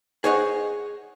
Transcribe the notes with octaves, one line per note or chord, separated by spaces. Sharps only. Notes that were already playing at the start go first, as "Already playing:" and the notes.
G#4 C5 C#5 D#5 F5 F#5